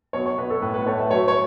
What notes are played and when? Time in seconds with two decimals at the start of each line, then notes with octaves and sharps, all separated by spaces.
0.13 B1 C#5
0.26 C#5
0.38 B1 B4
0.50 A4
0.62 A2 B4
0.74 B4
0.86 A3 C#5
0.99 E5
1.11 F#3 C#5
1.28 C#5